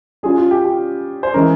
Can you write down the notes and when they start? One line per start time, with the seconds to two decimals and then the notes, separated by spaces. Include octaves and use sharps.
0.23 G3 C#4 F4 G#4
0.38 F4
0.51 G4
0.65 G4
1.23 C5
1.34 E3 G#3 C#4 A#4